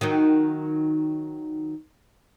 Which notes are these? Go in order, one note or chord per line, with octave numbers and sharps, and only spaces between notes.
D#3 F#3 D#4